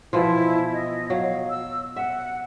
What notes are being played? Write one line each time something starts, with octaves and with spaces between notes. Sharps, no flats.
B2 E3 F3 E4
D#5
F#3 F5
E6
E5 F#5